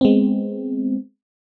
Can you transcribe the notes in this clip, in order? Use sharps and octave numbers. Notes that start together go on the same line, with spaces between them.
G#3 B3 C4